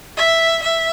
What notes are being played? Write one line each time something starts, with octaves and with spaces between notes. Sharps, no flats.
E5
E5